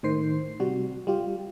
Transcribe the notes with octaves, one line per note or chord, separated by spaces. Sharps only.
A2 D#3 C5 C7
C3 G3 F#4
G3 F4 G4